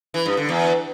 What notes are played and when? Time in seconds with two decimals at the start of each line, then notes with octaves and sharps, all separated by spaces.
0.14 E3
0.26 G2
0.37 D3
0.49 E2